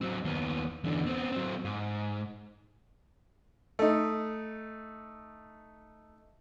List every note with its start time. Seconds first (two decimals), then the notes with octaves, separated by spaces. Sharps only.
0.01 F#3 C4
0.25 D#2 B3
0.84 E2 D3
1.06 B3 C4
1.32 F#3 C4
1.64 G#2
3.79 A3 D#4